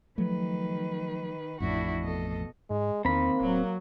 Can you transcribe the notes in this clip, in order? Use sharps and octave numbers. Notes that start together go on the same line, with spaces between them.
D#3 F3 F#3 A3 B4
A1 F2 A2 D4 E4 F#4
B2 A4 D#5
G#2 G#3
E2 D#3 A#3 C4 B5
D1 F#3